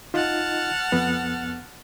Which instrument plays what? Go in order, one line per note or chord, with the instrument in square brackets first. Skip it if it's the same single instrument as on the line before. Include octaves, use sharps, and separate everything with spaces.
[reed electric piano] D#4 F4 D#5 [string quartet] F#5 A5 F6
[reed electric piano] F2 B3